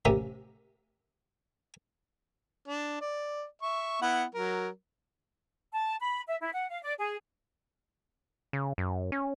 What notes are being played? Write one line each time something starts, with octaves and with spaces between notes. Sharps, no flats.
A1 C3 C#4 G4 A#4 E5
D4
D5
E5 C#6
B3 E4 F#5
F#3 A#4
A5
B5
E5
E4
F#5
F5
D5
G#4
C#3
F#2
C#4